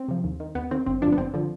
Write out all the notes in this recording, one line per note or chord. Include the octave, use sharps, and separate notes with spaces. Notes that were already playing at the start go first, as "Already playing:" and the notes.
Already playing: C4
C3 F3
D#2
D#3
D#2 B3
D#3 C4
G1 C4
G2 D3 F3 D4
B3
G1 C4
D3 F3